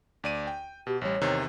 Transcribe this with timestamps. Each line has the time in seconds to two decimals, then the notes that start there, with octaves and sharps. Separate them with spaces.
0.24 D2 D5 D#7
0.47 G5
0.87 B2 G4
1.01 A1 G3 C#5
1.21 E2 C3 D#3